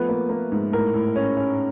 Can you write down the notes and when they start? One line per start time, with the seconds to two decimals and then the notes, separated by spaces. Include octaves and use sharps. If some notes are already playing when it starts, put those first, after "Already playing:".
Already playing: F3 A3 B3 B4
0.09 A#3
0.29 A#3
0.52 G#2
0.72 A2 A#4
0.94 A2
1.16 C#4
1.37 C#4